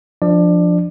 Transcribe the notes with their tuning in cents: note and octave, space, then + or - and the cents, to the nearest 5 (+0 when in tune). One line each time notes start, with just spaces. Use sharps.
F3 +0 D4 +0 D5 +25